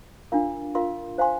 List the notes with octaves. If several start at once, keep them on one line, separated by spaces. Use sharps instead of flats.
D4 F4 A#4 F5
F4 A#4 F5 C6
C5 F5 G#5 C6